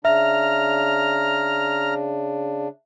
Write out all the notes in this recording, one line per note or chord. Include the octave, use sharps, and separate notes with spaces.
C#3 D4 E5 A#5 F6